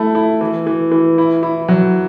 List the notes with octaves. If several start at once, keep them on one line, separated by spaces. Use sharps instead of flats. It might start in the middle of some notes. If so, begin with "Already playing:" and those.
Already playing: A3 E4
E4
E3
E3
E3
E4
E4
F#3